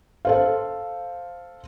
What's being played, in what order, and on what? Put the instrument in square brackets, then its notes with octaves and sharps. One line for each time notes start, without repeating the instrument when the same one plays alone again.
[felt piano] A4 C5 F5